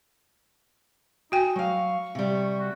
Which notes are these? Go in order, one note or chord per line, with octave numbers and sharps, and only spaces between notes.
D#4 F#4 G5 G#5
F#3 F5 C#6
C3 G3
F#4